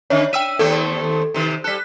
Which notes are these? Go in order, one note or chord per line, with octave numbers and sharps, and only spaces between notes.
D3 C#4 C#5 E5
E5 G5 E6 D#7
D#2 A3 C4 A4
C3 D#3
G3 A4 F#6 B6